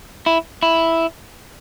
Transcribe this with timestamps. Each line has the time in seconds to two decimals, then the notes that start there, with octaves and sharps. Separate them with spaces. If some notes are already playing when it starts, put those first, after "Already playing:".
0.26 E4
0.63 E4